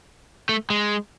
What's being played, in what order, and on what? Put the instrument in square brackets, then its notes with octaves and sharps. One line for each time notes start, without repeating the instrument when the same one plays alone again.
[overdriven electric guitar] A3
G#3